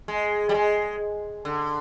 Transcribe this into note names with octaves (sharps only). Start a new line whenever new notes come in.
G#3
G3
G#3
D3